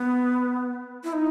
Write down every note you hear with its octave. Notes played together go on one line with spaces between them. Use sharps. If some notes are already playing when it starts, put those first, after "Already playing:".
Already playing: B3
E4
D#4